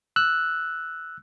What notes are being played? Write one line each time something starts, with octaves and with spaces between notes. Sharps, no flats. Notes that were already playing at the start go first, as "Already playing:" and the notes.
E6 F#6